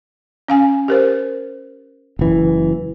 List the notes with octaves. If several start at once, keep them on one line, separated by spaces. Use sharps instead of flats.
C#4 F5 G#5
G4 A#4 C5
F#1 E3